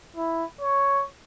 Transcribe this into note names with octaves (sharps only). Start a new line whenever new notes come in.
E4
C#5